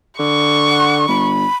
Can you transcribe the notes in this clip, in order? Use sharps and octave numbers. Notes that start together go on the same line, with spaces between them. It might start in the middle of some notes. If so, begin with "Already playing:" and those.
D3 C#6
F#5
G1 B5